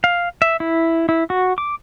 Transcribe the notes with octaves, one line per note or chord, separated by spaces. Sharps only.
F5
E5
E4
E4
F#4
D6